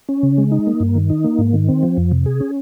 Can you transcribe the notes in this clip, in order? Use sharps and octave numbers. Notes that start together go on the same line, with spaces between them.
C#4
C#3
G#3
D#4
A#3
G2
D#3
D#4
A#3
G#2
D#3
C4
F3
F2
C3
G#4
C#4